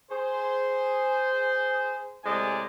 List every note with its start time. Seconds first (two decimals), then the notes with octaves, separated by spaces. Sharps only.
0.11 G#4 C5
2.24 A2 C3 G#3 C5 D5 G#5